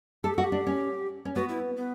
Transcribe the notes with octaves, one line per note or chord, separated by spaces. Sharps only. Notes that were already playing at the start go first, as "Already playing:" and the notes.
G4 A4
F#4 A4
G4
D4
C#4
C#4
B3 F#4
E4
B3